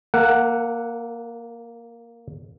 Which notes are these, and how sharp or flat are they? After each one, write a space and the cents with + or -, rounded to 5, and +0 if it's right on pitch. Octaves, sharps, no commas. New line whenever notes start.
A#3 +0 A#4 -45 F#5 +0